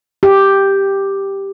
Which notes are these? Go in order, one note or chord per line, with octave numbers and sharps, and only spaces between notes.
G4